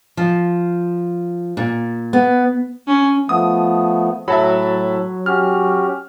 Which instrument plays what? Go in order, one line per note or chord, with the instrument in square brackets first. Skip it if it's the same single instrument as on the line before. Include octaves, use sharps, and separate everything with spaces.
[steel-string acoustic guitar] F3
A#2
B3
[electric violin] C#4
[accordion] F3 A3 B3 [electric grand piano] D#6
[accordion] A2 [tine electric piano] F#3 [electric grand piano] E5 A5 B5
[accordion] C#4 F#4 G4 [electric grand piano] F6